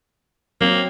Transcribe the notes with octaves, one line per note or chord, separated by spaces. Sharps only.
F#3 A#3 C4